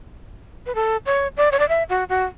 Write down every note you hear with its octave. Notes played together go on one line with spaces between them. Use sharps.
B4
A4
C#5
D5
C#5
D5
E5
F#4
F#4